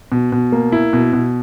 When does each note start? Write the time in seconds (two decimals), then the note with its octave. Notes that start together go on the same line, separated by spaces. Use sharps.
0.12 B2
0.32 B2
0.52 A#3
0.72 E4
0.93 B2
1.13 B2